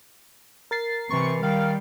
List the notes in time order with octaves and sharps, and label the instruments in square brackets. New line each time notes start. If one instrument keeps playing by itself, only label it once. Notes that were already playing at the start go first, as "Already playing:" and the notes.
[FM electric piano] A#4 A6 C7
[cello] C3 [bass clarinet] E3 [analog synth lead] C#6
[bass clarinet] D#3 [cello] G3 [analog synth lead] F5